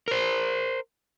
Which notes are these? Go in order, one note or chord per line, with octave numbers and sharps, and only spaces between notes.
A#4 C5